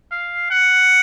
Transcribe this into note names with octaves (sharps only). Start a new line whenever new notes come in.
F5
F#5